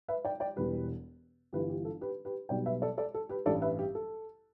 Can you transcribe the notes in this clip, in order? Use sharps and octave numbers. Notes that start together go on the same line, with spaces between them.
B4 E5
D5 G5
D5 G5
E1 E2 B2 G3 G4 B4
G1 G2 E3 G3 G4 B4
G4
A4
G4 B4
G4 B4
B1 B2 G3 D5 G5
B4 E5
A4 D5
A4 D5
A4
G4 B4
A1 G2 G3 A4 D5
B4 E5
G4
A4